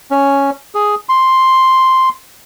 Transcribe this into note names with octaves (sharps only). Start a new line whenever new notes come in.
C#4
G#4
C6